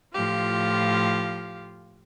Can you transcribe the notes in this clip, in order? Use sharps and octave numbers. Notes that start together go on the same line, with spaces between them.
A2 F3 F4 G4 F5